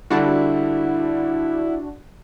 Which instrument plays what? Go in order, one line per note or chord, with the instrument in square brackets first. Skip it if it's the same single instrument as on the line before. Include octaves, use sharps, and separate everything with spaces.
[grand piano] D3 G3 [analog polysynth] D4 F#4 [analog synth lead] E4